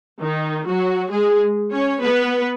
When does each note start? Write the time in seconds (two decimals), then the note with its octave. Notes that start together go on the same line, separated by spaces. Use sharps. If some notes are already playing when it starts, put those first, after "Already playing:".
0.21 D#3 D#4
0.67 F#3 F#4
1.11 G#3 G#4
1.72 C#4 C#5
2.02 B3 B4